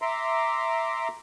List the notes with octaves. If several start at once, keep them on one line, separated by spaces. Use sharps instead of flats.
E5 A#5 C6 D6